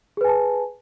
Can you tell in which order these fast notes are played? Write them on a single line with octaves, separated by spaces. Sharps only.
G#4 B4 G#5 A5